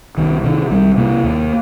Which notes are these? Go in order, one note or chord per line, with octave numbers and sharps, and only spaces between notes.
C2 D#3
C3 D#3
C2 G3
C3 A#3
D#2